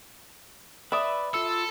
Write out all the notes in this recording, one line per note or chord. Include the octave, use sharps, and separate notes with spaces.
B4 D5 E5 B5 D#6
F4 A4 E6